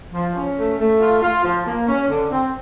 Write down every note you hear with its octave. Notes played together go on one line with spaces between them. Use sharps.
F3
C#4
A3
A3
F4
F4
F3
A#3
C#4
D3
C4